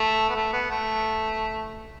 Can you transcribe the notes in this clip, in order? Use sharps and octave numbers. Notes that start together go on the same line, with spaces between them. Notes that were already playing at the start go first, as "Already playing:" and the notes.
Already playing: A3
B3
A3
B3
A3